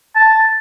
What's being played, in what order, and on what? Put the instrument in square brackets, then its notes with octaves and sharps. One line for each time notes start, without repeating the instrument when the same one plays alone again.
[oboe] A5